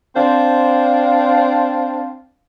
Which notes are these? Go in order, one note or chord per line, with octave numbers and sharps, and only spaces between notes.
C4 D4 C5 F5